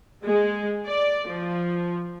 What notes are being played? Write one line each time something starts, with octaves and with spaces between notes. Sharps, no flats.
G#3
D5
F3